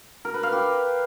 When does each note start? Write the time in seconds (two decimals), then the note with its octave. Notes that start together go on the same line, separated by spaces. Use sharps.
0.25 A#4
0.34 B4
0.43 F5
0.52 G4